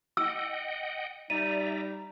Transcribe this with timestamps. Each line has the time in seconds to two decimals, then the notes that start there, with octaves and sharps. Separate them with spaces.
0.17 D#5 F#5 G5 E6
1.30 G3 D#4 D5 E5 A#5 D#7